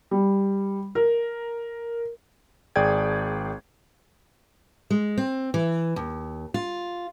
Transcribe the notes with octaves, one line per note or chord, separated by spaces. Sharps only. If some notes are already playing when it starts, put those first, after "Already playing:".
G3
A#4
G#1 G#4 D5 G5 G#6
G#3
C4
E3
D#2
F4